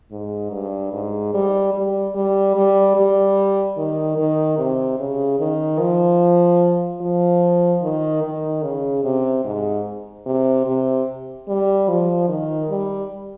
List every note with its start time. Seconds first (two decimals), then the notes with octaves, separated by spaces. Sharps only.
0.11 G#2
0.52 G2
0.93 G#2
1.34 G3
1.73 G3
2.15 G3
2.56 G3
2.96 G3
3.77 D#3
4.18 D#3
4.58 C3
4.99 C#3
5.40 D#3
5.79 F3
7.01 F3
7.82 D#3
8.23 D#3
8.63 C#3
9.04 C3
9.44 G#2
10.26 C3
10.66 C3
11.48 G3
11.88 F3
12.28 D#3
12.70 G3